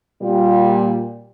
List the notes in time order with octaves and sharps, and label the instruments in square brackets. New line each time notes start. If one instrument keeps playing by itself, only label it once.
[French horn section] A#2 G3